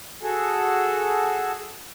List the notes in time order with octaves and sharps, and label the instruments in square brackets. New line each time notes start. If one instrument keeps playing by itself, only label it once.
[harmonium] F#4 G#4 A4